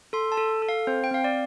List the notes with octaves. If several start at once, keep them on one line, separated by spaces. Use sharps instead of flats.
A4 C6
A5
A4
A4
F5
C4 C5
G5
C4 F5
D5